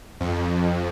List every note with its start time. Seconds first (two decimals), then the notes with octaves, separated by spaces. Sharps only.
0.20 F2